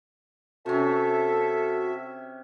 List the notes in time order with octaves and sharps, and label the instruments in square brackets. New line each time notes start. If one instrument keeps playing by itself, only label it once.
[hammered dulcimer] C3 C#4 [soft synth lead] F#4 [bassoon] A4 [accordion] E5